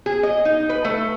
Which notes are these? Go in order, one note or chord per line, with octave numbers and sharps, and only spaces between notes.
G#4
D#5
D#4
B4
A3